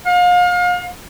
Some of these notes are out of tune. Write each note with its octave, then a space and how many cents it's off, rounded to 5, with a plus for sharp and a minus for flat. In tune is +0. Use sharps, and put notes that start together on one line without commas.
F5 +35